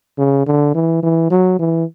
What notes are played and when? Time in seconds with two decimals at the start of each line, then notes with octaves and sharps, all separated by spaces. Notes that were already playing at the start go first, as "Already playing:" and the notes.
0.18 C#3
0.46 D3
0.75 E3
1.03 E3
1.30 F#3
1.59 E3